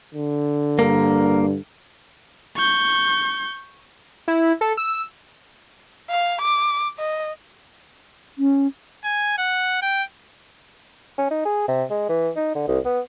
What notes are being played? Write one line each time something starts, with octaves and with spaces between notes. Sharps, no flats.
D3
G2 A#3 A#4
C#6 G6
E4
A4
E6
F5
D6
D#5
C#4
G#5
F#5
G5
C#4
D#4
G#4
C3
G#3
E3
D#4
D3
C2
B3